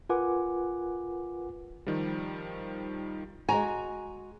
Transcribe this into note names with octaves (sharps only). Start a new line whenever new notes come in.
F4 A#4 B4 F#5 G#5 D6
D#3 F3 G3
G#3 F#4 G#5 A#5